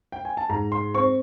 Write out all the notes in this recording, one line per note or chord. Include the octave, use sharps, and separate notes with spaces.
G5
G#5
A5
G#2 A#5
C6
C4 C#6